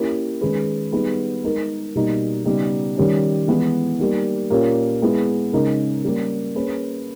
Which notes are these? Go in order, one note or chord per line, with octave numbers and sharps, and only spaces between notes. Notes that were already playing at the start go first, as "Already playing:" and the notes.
Already playing: A#3 C#4 E4 G4 A#4
D#3 G#3 C#4 G#4 B4
G3 B3 D#4 G#4 B4
G#3 D#4 A#4
B2 G3 A#3 D#4
C#3 G3 B3 D#4
D#3 G3 C#4
E3 G#3 B3 E4
G3 A#3 D#4
A#2 A#3 C#4 G4
G#3 B3 E4 G#4 B4
C#3 G#3 D#4 A#4
G3 A#3 C#4 G4
A#3 C#4 G#4 B4